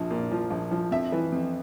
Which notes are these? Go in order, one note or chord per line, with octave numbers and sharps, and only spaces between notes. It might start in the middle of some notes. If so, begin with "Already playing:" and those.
Already playing: A#1 F3
A#2
F3
A#1
F3
F2 E5
E3
F2